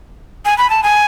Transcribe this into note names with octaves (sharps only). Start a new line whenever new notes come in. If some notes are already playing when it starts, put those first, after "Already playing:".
G#5
B5
A5
G#5